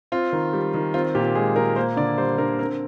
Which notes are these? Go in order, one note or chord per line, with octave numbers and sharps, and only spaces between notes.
C4 F4
D#3
G3
D#3
C4 F4
A#2 G4
G#3 G#4
A#2 A#4
A#3 C5
D3 D5
G3 C5
D3 A#4
C4 A#4